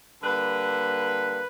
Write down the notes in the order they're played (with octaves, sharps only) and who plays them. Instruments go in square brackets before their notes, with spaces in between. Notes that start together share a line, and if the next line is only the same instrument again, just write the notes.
[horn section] D3 G3 A#3 B4